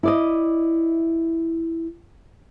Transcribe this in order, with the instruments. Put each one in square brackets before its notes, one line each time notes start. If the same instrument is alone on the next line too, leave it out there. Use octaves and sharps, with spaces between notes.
[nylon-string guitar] E4 D5 D#5